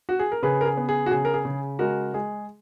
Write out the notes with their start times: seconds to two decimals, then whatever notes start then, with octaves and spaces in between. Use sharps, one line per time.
0.09 F#4
0.19 G#4
0.32 A#4
0.42 C#3 G#4 B4
0.61 A#4
0.65 G#4
0.77 B3
0.89 G#4
1.06 F#4
1.11 C#3 G#4
1.25 A#4
1.34 G#4
1.45 C#3
1.79 G#3 F#4 A#4
2.14 G#3 G#4